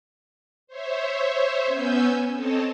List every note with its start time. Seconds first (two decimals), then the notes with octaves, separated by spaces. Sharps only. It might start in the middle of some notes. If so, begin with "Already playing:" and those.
0.67 C5 C#5 E5
1.66 B3 C#4 G#5 E6 G6
2.34 C4 A4 C#5 D#5 A5